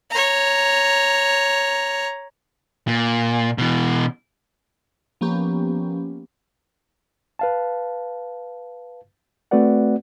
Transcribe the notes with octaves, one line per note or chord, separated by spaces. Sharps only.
C#5 A#5
A#2
B2 E3
F3 A#3 B3 C#4 G4
B4 F5 A5
A3 C4 F#4 B4 D5 F#5